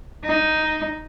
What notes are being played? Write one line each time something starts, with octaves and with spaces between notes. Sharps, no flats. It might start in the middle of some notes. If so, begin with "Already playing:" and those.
D#4